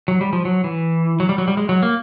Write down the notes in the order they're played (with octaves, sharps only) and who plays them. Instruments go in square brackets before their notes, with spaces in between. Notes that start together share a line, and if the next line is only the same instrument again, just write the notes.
[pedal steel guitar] F#3
G3
F3
F#3
E3
F#3
G3
F#3
G3
G#3
F#3
A#3